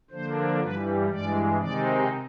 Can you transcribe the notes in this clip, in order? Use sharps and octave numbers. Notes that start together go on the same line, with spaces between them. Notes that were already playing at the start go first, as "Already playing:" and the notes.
D3 F3 A#3 D4 C5
G2 E3 G3 B4
G2 E3 G#3 D5
C3 D#3 G#3 C4 D#4 D5